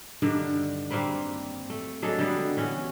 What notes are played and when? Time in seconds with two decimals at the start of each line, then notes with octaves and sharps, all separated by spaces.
0.22 G2 D3 D#3 D4
0.90 G3 A#3 C4 B4
1.70 A3
2.02 F#3 G#3 D4 A4
2.19 D3 G3 B3
2.57 E3 C#4 F#4